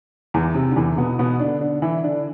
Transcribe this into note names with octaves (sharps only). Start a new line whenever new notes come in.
E2 E3
C3
D3
E2 E3
B2 B3
B2 B3
D3 D4
D3 D4
E3 E4
D3 D4